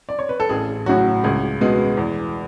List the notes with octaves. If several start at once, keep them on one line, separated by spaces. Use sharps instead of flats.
D5
C#5
B4
A4
A1 G#4
A2 F#3 F#4
C#2 G#4
B2 G#3 B3
E2